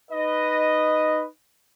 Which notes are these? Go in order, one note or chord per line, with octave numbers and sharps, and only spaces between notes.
D#4 B4 D#5